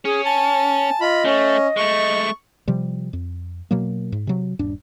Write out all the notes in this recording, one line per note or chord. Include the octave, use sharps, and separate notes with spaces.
C#4 G#4
G#5 A5
F4 D#5 B5
A3 C#4
G#3 A3 C#6
C3 F3 G3
F2
B2 F#3 A#3
G#2
C3 F#3
D#1 G2 D4